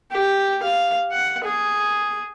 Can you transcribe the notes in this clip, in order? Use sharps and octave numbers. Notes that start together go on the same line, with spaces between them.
G4
F5
F#5
G#4